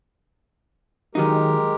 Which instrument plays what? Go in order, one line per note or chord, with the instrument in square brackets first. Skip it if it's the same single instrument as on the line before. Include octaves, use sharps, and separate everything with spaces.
[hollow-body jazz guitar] D#3 F#3 D#4 [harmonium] G#3 G4 A#4